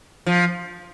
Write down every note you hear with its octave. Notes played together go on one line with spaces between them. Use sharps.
F3